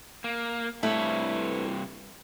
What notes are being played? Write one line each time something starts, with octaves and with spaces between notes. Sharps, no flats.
A#3
G2 C3 A3 E4 B4 C#5